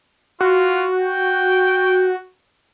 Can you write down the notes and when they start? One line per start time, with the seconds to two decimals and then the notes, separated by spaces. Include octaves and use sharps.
0.41 F4 F#4
1.00 G5